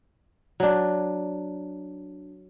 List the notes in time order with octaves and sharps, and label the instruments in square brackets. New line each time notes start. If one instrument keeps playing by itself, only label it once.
[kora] F#3 D4